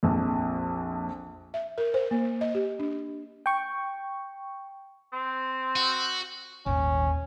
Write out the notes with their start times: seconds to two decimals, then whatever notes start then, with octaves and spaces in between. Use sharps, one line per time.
0.03 A#1 F2
1.54 E5
1.78 A#4
1.94 C5
2.11 A#3
2.41 D#5
2.55 G4
2.79 D4
3.46 G5 C#6
5.13 C4
5.76 F#4
6.66 D#1 G#1 D#2 C#4